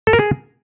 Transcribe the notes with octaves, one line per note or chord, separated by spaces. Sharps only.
A4
A#4
G#4